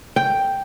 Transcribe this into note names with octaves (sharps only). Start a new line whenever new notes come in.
G5